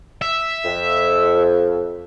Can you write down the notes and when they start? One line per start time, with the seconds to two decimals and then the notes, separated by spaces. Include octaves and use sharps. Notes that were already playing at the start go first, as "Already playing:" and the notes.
0.22 E5
0.64 F2